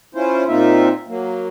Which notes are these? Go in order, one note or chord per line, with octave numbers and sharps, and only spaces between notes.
C#4 E4 F4 C5
A#2 A#3 C4 D#4 F4 E5
F#3 A#3